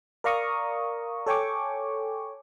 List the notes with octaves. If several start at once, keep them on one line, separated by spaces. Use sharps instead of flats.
A#4 D5 F5 A#5 C#6 D#6
A4 C#5 G5 G#5 C#6 D6